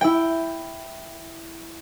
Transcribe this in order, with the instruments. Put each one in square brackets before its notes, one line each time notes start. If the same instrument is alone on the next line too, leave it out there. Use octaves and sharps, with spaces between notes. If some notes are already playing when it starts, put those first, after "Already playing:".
[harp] E4 G5